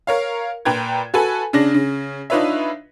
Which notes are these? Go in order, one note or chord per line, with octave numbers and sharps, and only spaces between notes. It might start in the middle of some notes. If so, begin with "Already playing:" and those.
A#4 C#5 F5
A#2 B4 G5 A#5 G#6
F#4 A4 B4 G#5
C#3 D4 A#6
C#3
D4 D#4 F4 B4 C#5 E5